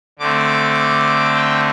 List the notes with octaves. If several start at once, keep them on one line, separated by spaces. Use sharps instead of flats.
D3 A3 C4 D6
G5